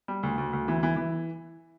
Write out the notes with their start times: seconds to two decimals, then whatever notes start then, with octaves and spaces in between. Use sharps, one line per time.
0.08 G3
0.23 D2
0.38 D2
0.53 D2
0.68 E3
0.83 E3
0.97 E3